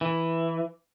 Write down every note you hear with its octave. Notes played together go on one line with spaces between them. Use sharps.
E3